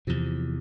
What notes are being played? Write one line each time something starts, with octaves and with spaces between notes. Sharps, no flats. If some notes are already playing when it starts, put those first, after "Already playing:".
E2 C3 F3